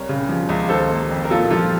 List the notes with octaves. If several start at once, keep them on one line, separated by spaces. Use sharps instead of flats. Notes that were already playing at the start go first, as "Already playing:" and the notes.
Already playing: C2 A#4 C#5
C#3
F3
C#2
D#3 A4 C5
A#3
F2
A#4
A#2 F4 A4
F3 F4 A4